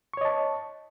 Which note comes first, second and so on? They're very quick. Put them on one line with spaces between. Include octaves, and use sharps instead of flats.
C#6 C#5 D#5 A5